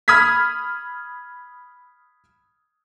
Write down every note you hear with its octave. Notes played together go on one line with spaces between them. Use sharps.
B5 D#6 F6 G#6 B6